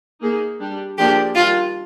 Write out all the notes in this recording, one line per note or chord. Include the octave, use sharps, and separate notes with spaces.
A#3 D#4 G#4
G3 D4 G4
F3 A#3 D4 G4 G#4 D5
D#3 G3 D4 F4